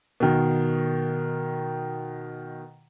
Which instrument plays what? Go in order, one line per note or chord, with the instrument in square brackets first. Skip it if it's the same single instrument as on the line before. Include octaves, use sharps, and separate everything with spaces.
[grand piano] B2 D#3